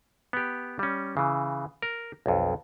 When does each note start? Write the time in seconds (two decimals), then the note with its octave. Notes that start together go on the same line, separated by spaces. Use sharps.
0.33 B3 G4
0.79 G3 C#4
1.17 C#3 E3
1.82 A#4
2.26 B1 F2